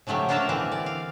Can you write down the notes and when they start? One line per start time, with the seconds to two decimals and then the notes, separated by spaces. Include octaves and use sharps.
0.07 C#3 F3 F#3 A3 G4
0.29 A#3 D4 F4 A#4 E5 A5
0.49 D3 E3 C4 G4
0.72 D5
0.86 F5